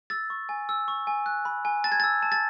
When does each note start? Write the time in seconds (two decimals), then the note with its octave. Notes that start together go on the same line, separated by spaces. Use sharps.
0.10 E6 A6
0.30 C#6
0.49 G#5
0.69 E6
0.88 C#6
1.07 G#5
1.26 F#6
1.45 B5
1.65 G#5
1.84 A5 A6
1.92 G#6
2.00 E6 A6
2.23 A5
2.32 A6